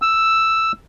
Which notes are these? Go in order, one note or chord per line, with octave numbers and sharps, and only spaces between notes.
E6